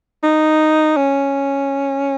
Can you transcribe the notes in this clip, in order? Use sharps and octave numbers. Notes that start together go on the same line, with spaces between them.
D#4
C#4